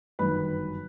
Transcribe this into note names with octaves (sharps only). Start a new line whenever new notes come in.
G1 F#2 D#3 B4 B5